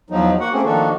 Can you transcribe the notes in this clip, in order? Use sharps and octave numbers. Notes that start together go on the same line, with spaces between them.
E2 F3 F#3 D#4
A#3 F#4 F#5
A3 A#3 C4 C#4 G#4
D#3 F3 A#3 D4 F#4 A4